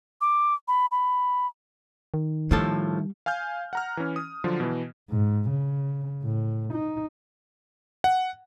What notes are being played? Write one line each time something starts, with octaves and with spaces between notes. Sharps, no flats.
D6
B5
B5
D#3
A2 F3 G3 A4
F5 G#5 F6 G6
F#5 A#5 F6
E3 C#4
D#6
D3 F3 F#3 F4
B2 E3
G#2
C#3
A2
D#4
F#5